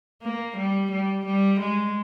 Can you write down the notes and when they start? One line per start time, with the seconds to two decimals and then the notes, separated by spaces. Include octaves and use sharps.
0.22 A#3
0.56 G3
0.91 G3
1.25 G3
1.60 G#3